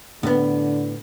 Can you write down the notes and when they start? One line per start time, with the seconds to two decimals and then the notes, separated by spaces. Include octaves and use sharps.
0.23 A2 D3 B3